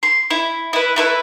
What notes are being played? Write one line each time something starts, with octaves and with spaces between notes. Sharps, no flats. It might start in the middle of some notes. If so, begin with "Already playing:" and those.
C6
E4
E4 B4
A3 E4 B4